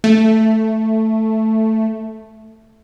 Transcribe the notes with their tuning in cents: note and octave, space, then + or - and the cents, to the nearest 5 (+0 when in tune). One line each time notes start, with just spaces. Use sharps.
A3 +0